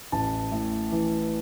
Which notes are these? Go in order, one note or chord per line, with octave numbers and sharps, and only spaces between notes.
A1 A5
A2
E3